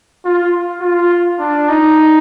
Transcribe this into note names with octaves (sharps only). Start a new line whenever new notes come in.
F4
F4
D4
D#4